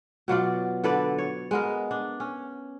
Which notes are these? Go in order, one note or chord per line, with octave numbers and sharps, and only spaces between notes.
B2 F#3 F4 D5
D3 A4 B4 D5
C#5
G#3 B3 A#4
D4
C#4